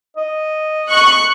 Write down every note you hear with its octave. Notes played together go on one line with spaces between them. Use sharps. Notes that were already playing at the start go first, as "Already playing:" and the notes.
D#5
C#6 F#6